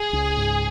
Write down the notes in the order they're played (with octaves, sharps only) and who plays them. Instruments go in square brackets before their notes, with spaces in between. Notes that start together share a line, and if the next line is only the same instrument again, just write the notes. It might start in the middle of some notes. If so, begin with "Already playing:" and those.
Already playing: [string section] G#4
[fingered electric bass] C#2
G#2